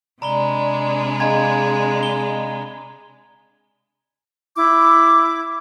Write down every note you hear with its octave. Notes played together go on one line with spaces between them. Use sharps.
C3 G#3 D4 D5 A#5 B5 G7
G#4 D#5 F5 G#5 A#5 G#6
G7
E4 D6